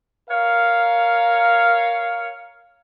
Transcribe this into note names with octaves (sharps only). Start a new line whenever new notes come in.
A#4 C#5 F5